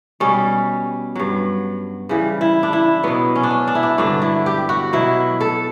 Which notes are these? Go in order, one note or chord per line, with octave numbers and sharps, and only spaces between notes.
B2 G3 C#4
G2 F#3
C#3 E3 G3
E4
D4
E4
B2 F#3 B3
C#4
D4
C#4
D4
E4
D4
G2 D3 F#3 D4
E4
G4
F#4
B2 F#3 E4
A4